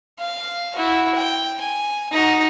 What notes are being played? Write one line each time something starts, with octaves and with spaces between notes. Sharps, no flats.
F5
E4 F#4
G5
G#5
D#4 F#4